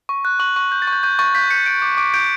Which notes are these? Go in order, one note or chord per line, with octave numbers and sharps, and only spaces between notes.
C#6
F#6
C#6 F#7
C#6
G6
A6
C#6
G6
C#6 G6
C#6 A6
G6 B6
G6 C#7
G6 D7
D6 C#7
D6 D7
G6 D7